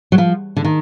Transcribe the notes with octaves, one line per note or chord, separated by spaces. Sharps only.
F#3
F3
D3
D#3